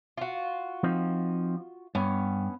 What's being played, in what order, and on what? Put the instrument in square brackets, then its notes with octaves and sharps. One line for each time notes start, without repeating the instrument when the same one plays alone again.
[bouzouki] F4 F#4
[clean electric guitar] F3 C4 D#4
[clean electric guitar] G2 [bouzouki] B3 C#4